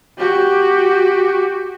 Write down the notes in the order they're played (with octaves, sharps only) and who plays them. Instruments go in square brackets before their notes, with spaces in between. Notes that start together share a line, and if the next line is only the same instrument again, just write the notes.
[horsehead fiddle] F#4 G4